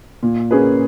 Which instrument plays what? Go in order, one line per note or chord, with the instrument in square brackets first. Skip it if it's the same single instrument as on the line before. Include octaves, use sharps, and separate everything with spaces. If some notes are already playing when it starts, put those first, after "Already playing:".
[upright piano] A#2
A#3 C#4 G#4 B4